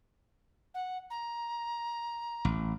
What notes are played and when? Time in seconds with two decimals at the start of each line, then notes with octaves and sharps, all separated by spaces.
0.74 F#5
1.10 A#5
2.45 A1